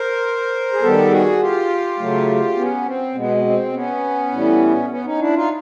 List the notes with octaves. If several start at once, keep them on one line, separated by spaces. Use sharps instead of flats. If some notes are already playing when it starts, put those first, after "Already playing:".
Already playing: A#4 C5
G#4
D#3 G3 B3 G4 A4
F#4 G#4
F4 G4
C#3 F#3 A3
B3 C#4
C4
B2 G#3 B3
B3
C4
B3 C#4
A2 E3 G3
B3 C#4
C#4 D#4
D4 E4
D#4 F4